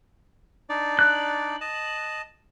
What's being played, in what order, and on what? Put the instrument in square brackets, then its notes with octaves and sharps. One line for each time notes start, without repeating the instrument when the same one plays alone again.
[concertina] D4 D#4 D5
[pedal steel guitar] F#6
[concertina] D#5 A5